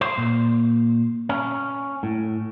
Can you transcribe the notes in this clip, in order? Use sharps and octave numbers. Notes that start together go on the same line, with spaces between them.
C5
A#2
C#4
A2